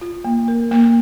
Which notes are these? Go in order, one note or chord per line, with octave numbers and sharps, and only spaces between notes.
F4
A#3
A#4
A#3